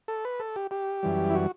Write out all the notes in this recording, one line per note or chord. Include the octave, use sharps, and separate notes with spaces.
A4
B4
A4
G4
G4
F#2 E3 G3
E4
F#4